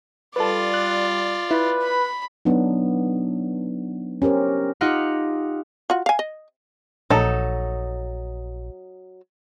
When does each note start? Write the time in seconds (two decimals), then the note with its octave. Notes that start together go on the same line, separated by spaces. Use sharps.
0.36 G3 F4 A4 B4 D5
0.74 F#6
1.51 E4 B4
1.83 B5
2.45 F#3 B3 D4 D#4
4.22 C#4 G4 A#4 C5
4.81 D#4 F4 G4 F5 F#5
5.90 F4 F#4
6.06 F5 G#5
6.19 D#5
7.10 A#1 F#3 D#4 A4